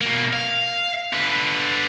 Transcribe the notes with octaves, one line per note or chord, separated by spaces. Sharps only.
B2 A#3
F5
D3 B4